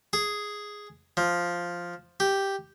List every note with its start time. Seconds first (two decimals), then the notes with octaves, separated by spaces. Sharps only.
0.13 G#4
1.17 F3
2.20 G4